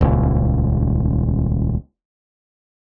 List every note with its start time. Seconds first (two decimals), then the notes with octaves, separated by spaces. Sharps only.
0.01 D#1 C#2